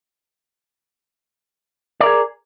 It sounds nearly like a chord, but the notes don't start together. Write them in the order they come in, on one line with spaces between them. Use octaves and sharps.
D5 A#4 G#4